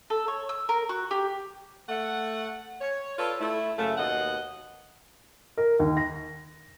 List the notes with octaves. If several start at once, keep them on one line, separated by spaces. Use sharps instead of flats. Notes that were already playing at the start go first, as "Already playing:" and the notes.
A4
C#5
E6
A#4
F#4
G4
A3 F#5
C#5
F4 A4 B4 C#5 D5
A3 E4
F#2 C#3 A3
D#2 B2 D#5 F#5
A#4
D#2
A#6